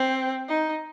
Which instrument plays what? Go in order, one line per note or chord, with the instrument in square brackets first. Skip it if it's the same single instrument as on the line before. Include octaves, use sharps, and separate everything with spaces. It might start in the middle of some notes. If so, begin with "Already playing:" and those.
Already playing: [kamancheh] C4
D#4